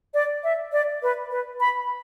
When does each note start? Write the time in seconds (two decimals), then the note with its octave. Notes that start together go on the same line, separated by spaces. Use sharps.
0.14 D5
0.44 E5
0.72 D5
1.03 B4
1.31 B4
1.60 B5